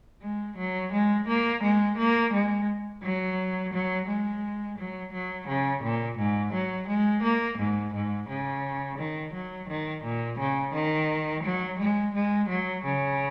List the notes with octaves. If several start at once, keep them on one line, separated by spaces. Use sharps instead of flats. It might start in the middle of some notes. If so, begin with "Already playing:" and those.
G#3
F#3
G#3
A#3
G#3
A#3
G#3
F#3
F#3
G#3
F#3
F#3
C#3
A#2
G#2
F#3
G#3
A#3
G#2
G#2
C#3
D#3
F#3
D#3
A#2
C#3
D#3
F#3
G#3
G#3
F#3
C#3